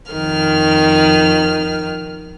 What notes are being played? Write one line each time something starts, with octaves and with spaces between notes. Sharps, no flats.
F2 D#3 F6